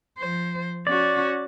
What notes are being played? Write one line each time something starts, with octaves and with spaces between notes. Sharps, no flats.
F3 C5
C#4 F#4 D5